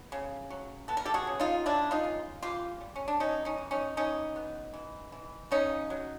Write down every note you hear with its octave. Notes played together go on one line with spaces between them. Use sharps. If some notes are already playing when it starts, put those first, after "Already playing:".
Already playing: B3
C#3
F#3
B3 A4
A#4
G4 A4
F#4 G#4
C#3
D#4 F4
C#3 D4 E4
D#4 F4
C#3
E3 F4 G4
G3
C#4
D4
G3 C#4 D#4
C#4 D#4
E3
C#4 D#4
E3 C#4 D#4
B3
E3
E3
C#3 C#4 D#4
F#3